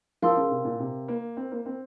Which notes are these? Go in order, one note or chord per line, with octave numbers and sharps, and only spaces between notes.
F3 A#4 F5 C6 E6
C#3
C3
A#2
C3
A#3
C4
A#3
C4